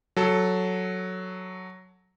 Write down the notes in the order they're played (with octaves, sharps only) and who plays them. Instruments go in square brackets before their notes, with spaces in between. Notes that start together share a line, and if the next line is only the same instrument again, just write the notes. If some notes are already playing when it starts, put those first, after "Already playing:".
[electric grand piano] F#3 A4